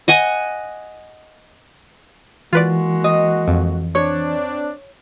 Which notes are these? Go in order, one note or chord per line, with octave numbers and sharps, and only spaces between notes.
D#5 F#5 G#5
E3 G#3 A#3 F4 F#4 B4 D5
D#5
F2
C4 D4 C#5